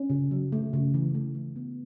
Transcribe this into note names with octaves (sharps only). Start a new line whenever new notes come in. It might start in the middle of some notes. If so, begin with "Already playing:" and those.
Already playing: C#4
C#3
F#3
A3
C#3
E3
A3
E3
B3